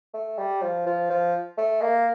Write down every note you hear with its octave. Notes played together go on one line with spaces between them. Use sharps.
A3
G3
F3
F3
F3
A3
A#3